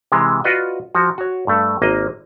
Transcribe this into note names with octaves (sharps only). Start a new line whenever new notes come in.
C3 E3 G#3
F4 F#4 B4 D5 D#5
F3 F#4
F#4 C#5
G2 A3
G#1 A#3 D#5